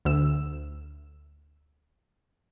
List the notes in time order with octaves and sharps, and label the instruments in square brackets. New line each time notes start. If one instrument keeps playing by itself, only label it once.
[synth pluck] D2 E6